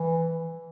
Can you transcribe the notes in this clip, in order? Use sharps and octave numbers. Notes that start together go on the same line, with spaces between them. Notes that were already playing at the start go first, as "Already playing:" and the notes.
Already playing: E3